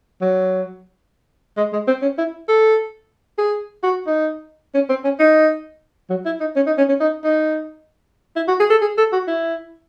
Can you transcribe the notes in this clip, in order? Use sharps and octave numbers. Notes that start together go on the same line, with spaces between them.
F#3
G#3
G#3
C4
C#4
E4
A4
G#4
F#4
D#4
C#4
C4
C#4
D#4
F#3
E4
D#4
C#4
D#4
C#4
C#4
D#4
D#4
E4
F#4
G#4
A4
G#4
A4
F#4
E4